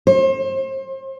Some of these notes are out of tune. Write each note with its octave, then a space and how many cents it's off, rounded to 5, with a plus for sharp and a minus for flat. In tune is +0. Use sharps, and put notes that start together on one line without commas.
C5 +35